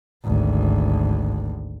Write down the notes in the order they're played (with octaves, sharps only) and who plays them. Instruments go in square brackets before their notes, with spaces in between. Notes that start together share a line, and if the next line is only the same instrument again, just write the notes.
[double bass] G#1 D2